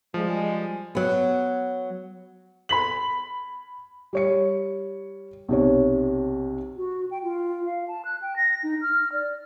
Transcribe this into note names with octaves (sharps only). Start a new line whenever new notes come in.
F3 G3 G#3
F#3 B3
B5 B6 F#7
G3 C#5 C#7
B1 C3 C#5
F#4
G5
F4
F5
A5
F#6
G5
A#6
D#4
F6
D5